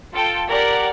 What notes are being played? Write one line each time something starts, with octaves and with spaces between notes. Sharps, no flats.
F4 A4 G5
G4 A#4 D5 F#5